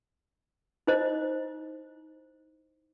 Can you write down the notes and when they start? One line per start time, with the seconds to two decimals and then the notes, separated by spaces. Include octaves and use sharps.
0.87 D#4 E4 C5 D#5